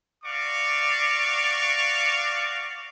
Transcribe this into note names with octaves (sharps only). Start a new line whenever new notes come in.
F#4 D5 F5 C#6 D6